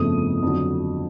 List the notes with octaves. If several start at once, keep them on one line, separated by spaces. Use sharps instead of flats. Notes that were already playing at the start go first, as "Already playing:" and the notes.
Already playing: G1 F2 C#3 F3 A3 D#6
F2 D3 F#3